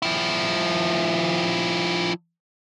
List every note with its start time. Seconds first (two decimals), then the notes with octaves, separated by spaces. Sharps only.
0.02 F3 E4